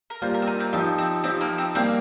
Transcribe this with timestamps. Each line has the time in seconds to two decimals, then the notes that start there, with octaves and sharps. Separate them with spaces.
0.10 A#4
0.22 G3 A#3 F4 C5
0.34 A#4
0.42 C4
0.47 D#4
0.60 C4
0.73 F3 C4 D#4 G4
0.98 C4
1.24 F3 C4 D#4 G4
1.41 A#3
1.58 C4
1.75 G3 A#3 C4 G4